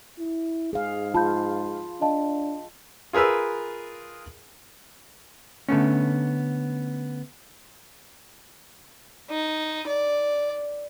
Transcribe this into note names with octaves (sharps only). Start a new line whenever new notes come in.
E4
G#2 G#4 F5
F4 A5 B5 G6
D4 D#5 F5 A5
F4 G#4 A#4 B4 E6
D3 A3 B3 C#4
D#4
D5